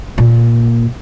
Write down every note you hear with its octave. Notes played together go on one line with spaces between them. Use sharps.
A#2